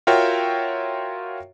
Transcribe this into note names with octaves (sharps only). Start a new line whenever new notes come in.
F4 F#4 A#4 C#5 E5 G5